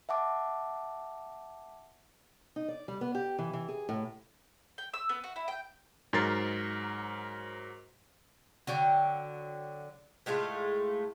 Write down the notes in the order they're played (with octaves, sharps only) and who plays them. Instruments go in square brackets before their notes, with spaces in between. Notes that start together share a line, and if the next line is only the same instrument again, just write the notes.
[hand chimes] E5 F#5 A5 D6
[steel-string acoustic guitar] D#4
D5
G3
B3
G4
E3
E3
G#4
A2
[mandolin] G5
E6
B3
F#4
E4
G5
[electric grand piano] G#2 F#3 A#4 A6 C7
[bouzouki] D3 F#3 G5
A2 G#3 A3 F4